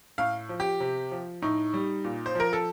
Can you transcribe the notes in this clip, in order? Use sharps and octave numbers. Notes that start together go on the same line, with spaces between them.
A2 F5
F3
G4
C3
F3
A2 D#4
G3
A#2
C5
F3 A#4
A4